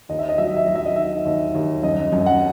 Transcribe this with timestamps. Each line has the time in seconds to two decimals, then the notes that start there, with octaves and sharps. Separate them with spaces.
0.09 D#2 D#5
0.19 E5
0.29 D#5
0.38 F#3 E5
0.47 D#5
0.57 E5
0.67 F#3 D#5
0.76 E5
0.85 D#5
0.96 D#3 E5
1.25 D#2
1.54 D#2
1.83 F#2 D#5
2.12 F#2
2.26 F#5